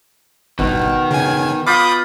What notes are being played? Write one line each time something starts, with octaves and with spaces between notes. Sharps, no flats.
G1 B2 D#3 D#4
C#3 G#5
F4 B5 D6 D#6 G6